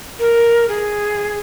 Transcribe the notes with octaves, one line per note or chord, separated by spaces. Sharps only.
A#4
G#4